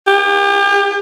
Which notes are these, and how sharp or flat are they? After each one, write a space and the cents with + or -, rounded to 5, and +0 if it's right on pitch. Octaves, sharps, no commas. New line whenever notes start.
G4 +40